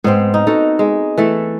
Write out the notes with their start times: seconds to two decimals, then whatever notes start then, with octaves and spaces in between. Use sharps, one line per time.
0.04 G#2 B3 C4 C5
0.34 D#4
0.47 D#4 F#4 A4
0.79 G#3
1.18 E3 A3 A4